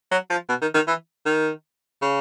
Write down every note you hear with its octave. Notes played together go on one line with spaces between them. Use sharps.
F#3
F3
B2
D#3
D#3
E3
D#3
C#3